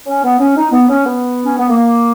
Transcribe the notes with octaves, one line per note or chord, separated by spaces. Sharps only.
C#4
B3
C#4
D#4
B3
C#4
B3
C#4
B3
A#3